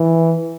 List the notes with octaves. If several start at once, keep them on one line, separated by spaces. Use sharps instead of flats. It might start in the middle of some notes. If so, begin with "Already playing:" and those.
Already playing: E3